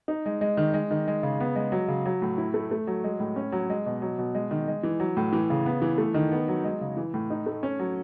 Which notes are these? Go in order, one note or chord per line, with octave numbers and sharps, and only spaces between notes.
D#4
G#3
G#3
D#3
G#3
D#3
G#3
C#3
B3
G#3
F#3
C#3
F#3
A2
E4
A3
A3
F#3
G#3
A2
C#4
F#3
G#3
B2
F#3
B2
G#3
D#3
G#3
E3
F#3
A2
E3
C#3
B3
E3
A3
D#3
B3
F#3
G#3
C#3
E3
A2
D#4
A3
C#4
F#3